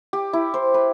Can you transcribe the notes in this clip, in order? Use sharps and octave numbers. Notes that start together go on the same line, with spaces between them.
G4
E4
C5
B4